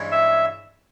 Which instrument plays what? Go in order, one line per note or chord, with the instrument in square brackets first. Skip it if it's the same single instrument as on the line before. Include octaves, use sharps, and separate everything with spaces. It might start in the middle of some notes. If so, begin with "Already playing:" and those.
Already playing: [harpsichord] G2 E3 G#3 C#4
[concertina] E5